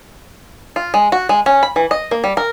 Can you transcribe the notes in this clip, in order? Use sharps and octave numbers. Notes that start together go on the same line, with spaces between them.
F4
G#3
F#4
G#3
C#4
B5
E3
D#5
A#3
G3
A#4